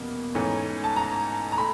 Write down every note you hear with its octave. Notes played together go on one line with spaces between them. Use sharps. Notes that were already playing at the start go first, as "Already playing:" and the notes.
Already playing: E2 B2 G3 A#3 C#4
G#2 E3 A3 C#4
A5
A#5
A#5
A3 B5